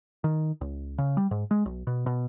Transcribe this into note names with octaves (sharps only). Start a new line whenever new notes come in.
D#3
C#2
C#3
G3
G#2
G#3
B1
B2
B2